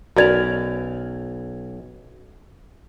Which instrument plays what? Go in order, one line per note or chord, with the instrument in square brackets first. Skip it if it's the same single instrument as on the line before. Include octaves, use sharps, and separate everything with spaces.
[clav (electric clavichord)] B1 [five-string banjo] C#4 A#4 D5 [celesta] F#4 G#6 F7